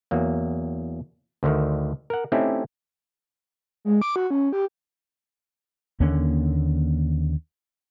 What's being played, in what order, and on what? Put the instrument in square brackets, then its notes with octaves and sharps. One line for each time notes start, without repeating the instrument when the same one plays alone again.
[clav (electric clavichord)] E2 F#3 A#3
D2 D3 D#3
A#4 F#5
A3 C4 C#4 D#4 E4 G4
[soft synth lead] G#3
D6
F#4
C#4
G4
[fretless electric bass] D#2 D3 A#3 C#4